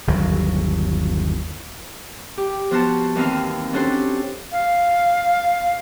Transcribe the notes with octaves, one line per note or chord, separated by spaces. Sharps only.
G1 D#2 F#3
G4
F3 B3 F#4 C5 A5
D#2 E3 C4 D#4 F5
C#4 D4 F#4 G4 A4 C5
F5